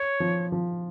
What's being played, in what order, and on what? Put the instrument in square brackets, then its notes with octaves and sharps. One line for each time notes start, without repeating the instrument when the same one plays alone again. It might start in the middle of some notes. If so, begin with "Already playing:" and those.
Already playing: [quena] C#5
[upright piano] F3
F3